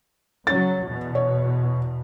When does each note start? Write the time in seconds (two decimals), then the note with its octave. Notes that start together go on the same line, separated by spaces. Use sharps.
0.47 C#3 F#3 C#4 A6
0.83 E2 B2
1.15 C#5